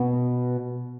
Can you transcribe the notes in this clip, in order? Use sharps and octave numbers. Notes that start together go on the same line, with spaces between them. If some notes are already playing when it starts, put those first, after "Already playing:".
Already playing: B2